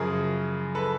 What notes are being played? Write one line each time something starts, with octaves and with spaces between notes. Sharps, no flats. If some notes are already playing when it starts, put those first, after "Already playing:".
Already playing: F#2 C#3 F3 G#4 A#4
A4 B4